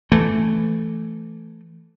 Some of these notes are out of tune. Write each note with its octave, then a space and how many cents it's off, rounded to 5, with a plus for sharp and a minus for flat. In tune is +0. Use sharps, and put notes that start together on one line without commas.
E3 +20 A3 +0